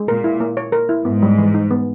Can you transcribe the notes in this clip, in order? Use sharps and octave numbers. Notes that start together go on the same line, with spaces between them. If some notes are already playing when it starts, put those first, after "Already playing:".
Already playing: G#3
A#2 A#4
E4
A#3
C#5
A#4
E4
G#2 B3
G3
E3
D#4
B3